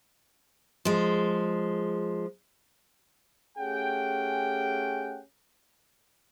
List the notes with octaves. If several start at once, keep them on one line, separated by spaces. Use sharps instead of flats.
F3 G#3
A3 C#4 G4 G#4 F#5 G5